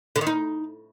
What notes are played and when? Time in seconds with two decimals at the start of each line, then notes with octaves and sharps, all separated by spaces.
0.16 D3
0.21 D#3
0.27 D#4